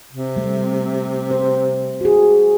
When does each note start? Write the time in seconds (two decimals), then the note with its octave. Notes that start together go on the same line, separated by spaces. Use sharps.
0.13 C3
0.36 G3 A3
1.30 G4 C5
2.01 F#4 G#4